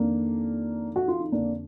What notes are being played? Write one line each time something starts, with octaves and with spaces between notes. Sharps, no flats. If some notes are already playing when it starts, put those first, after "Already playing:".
Already playing: F2 D#3 A#3 D4
F#4
F4
D#4
F2 D3 A#3 D4